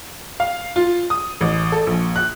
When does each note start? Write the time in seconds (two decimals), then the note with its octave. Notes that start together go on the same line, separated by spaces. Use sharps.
0.40 F5
0.76 F4
1.10 D#6
1.41 A1
1.72 A4
1.87 A#1
2.16 F#6